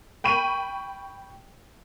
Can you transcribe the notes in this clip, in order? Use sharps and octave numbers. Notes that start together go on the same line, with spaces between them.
G5 B5 C#6 D#7